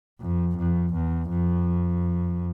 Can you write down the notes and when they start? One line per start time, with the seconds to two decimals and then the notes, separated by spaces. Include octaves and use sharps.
0.21 F2
0.57 F2
0.94 E2
1.30 F2